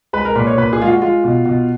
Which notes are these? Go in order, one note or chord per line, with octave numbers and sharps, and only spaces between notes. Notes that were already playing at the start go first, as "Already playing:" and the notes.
G#3 B4
A#4
A#2 B4
C#5
A#2 B4
G#4
G#3 F4
F#4
G#3 F4
B2
B2